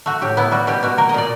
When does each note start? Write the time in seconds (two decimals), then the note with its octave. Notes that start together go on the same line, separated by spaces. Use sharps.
0.06 A3 F#4
0.22 A2 G4
0.37 B3 E4
0.52 G3 F#4
0.67 B2 G4
0.83 B2 F#4
0.98 A#3 A#4
1.09 D#5
1.14 A#2 D5